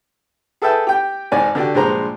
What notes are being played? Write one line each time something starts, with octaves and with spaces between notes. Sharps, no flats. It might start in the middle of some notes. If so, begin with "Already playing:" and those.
G#4 A4 B4 E5 G5 A5
G4 G5
G#1 G#2 D5 G#5
D3 D4 F#4 G4
A#1 G2 G#3 C5 A#5